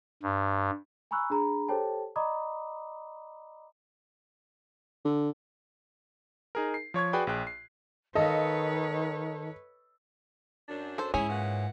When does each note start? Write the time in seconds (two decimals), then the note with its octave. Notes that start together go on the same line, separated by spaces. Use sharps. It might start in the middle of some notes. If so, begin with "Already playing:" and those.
0.23 G2
1.11 G#5 A#5 B5 C#6 E6 F#6
1.30 D4 G#4 A#5 B5
1.68 G4 A4 C5 C#5 G5 A5
2.16 D5 D#5 A#5 B5 D6 D#6
5.05 D3
6.55 D#4 G#4 A#4
6.74 C7
6.94 F3 C#5 C#6 G#6
7.13 F#4 G#4 B4 D5 G5 B5
7.27 A#1 G#4 G5 F#6
7.47 C7
8.15 D#3 A4 B4 C#5 D#5 F5
10.68 F#2 D4
10.98 A4 C5
11.14 G#2 C#4 E4 G#4 C#5
11.28 A#2 E3 F#5